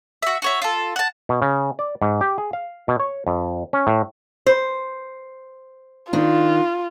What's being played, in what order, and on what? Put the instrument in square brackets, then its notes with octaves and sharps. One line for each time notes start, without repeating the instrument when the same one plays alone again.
[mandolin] F#4 E5
F#4 C#5 E5
F4 A4
F#5 A5
[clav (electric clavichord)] B2
C#3
D5
G#2
G4
G#4
F5
B2
C#5
F2
C#4
A2
[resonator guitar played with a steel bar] C5
[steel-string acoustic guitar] D#3 D4 [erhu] F4